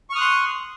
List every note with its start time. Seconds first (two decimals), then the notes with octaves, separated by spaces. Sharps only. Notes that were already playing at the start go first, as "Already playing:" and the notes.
0.10 C#6
0.13 F6
0.15 D#6
0.18 F#6
0.21 C6